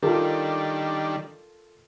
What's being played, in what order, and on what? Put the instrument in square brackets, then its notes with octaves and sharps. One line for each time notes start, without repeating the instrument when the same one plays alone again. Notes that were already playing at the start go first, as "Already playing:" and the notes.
[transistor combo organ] D#3 G3 D4 [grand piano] F4 A4 A#4